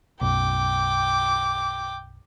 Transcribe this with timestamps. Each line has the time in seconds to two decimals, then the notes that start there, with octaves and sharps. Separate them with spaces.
0.21 B1 F#2 G5 D6